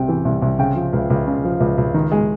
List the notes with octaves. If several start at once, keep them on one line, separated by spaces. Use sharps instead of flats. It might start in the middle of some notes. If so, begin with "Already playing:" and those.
Already playing: C2 C3 G5
E3
C2
C2
C#3 G5
F3
C#2
C#2
C#3
F3
C#2
C#2
D#3
G#3